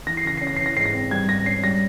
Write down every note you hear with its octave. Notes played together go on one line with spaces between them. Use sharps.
E3 A#6
C7
C#3 A#6
C#4 C7
A#6
E3 C7
A#6
G#2 C7
A#6
C4
G3 G#6
G#2 A#6
C#4 C7
G3 A#6